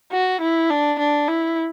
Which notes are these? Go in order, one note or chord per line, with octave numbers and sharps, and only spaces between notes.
F#4
E4
D4
D4
E4